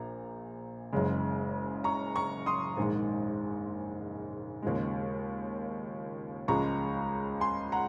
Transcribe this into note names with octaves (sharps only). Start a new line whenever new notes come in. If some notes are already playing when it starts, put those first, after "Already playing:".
Already playing: A#1 A#2 A#5
F#1 F#2 C#3 G#3
A#5 C#6
A#5 C#6
C6 D#6
A#1 G#2 D#3 G#3
D#2 C#3 F3 G#3
C#2 C#3 F3 G#3 A#5 C#6
G#5 C6
F#5 A#5